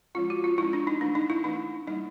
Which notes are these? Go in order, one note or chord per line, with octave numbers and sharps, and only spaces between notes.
F3 G#3 C#4 F4
F#4
F4
F3 G#3 C#4 E4
D4
D#4
E3 A3 C#4 D4
D#4
E4
E3 A3 C#4 D#4
G3 A#3 D4 D#4